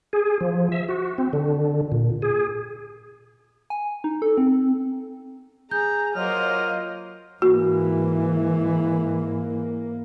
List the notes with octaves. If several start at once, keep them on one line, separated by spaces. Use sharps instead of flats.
G#4
F3
E5
F#4
C4
D3
A#2
G#4
G#5
D#4
A4
C4
G#4 A#5 G6
F#3 A#3 F4 C5 D#5 F6
G#2 E3 A#3 F#4